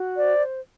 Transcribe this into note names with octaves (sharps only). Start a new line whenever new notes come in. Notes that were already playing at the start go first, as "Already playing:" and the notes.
Already playing: F#4
C5 D5